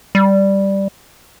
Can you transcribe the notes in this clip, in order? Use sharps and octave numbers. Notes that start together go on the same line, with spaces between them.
G3